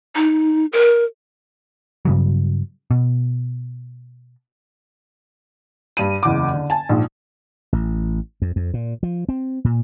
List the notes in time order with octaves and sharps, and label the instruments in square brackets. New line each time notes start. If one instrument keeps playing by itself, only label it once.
[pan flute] D#4
A#4
[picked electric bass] G2 C#3 F#3
B2
[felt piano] G2 D#7
F#1 E2 D6
D3
G#5 A5
A#1 G#2
[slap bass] A1
F2
F2
A#2
F3
C4
A#2